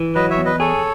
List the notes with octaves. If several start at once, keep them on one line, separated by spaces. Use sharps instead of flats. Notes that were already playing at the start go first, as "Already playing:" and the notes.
Already playing: E3
F#3 B4 D#5
C#5 E5
E2
B4 D#5
G#4 A4 C#5